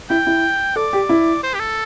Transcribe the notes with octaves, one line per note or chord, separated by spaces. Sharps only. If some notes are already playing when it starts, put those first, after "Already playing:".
E4 G5
E4
A4 D5
G4
E4
C5
G4
A4